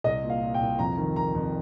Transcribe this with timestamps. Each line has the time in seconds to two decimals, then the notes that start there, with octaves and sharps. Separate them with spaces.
0.04 C2 D#5
0.23 A#2
0.30 F5
0.42 A#2
0.54 G5
0.61 C2
0.79 F2 A#5
0.97 D#3
1.16 D#3 A#5
1.35 F2